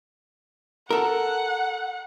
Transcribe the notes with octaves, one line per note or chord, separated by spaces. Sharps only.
A4 A#4 F#5